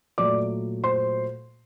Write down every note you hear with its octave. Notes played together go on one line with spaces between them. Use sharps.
A#2 F#3 A3 D5 D6
C5 C6